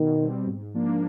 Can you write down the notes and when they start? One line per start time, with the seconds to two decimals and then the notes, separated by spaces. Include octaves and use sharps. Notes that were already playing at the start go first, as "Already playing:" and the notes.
Already playing: B2 D#3
0.20 G3 C4
0.47 G#2
0.74 F3 A#3 D4